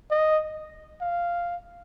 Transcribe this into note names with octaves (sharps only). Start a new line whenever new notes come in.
D#5
F5